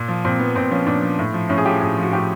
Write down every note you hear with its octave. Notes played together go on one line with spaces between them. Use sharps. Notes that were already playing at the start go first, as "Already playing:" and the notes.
Already playing: A#2
F3
A#2 C4
F3 B3
A#2 C4
F3 C#4
A#2 D4
F3
A2
F3
A2 C#4
G#4
F3 G4
A2 G#4
F3
F#4
A2 G4